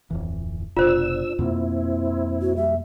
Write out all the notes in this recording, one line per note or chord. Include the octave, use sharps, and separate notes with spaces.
D1 F2 E3
F1 B2 D4 F4 C5 E6
F2 B2 A#3 C4 E4
F#4
G3 E5